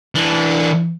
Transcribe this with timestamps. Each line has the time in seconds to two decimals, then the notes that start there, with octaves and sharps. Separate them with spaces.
0.15 E3 D4